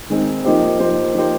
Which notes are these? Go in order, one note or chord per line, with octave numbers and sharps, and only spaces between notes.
D#3 G#3 C4
F3 A#3 D#4 G4 C5
F3 A#3 D#4 G4 C5
F3 A#3 D#4 G4 C5